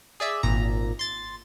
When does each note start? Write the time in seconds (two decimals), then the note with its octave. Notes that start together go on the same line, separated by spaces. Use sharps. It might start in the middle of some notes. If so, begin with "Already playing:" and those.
0.20 G#4 D5 E5
0.43 G#1 A#2 A#5
0.99 C6 A6